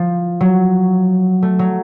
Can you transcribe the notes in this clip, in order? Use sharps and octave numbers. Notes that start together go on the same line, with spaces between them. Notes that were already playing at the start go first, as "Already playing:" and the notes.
Already playing: F3
F#3
A3
F#3